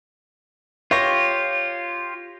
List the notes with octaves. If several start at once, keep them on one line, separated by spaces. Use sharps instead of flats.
F4 G4 C#5 C#6 A#6